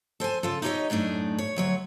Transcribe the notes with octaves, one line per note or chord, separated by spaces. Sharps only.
A4 C5 G5 G#5
C#3 F4 A4
D#4 E4 G4 A#4 C#5 D#5
F#2 A2 A3 D4 D#4
C#5
D2 F#3 C#5